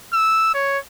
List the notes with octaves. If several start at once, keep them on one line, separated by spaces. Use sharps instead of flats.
E6
C#5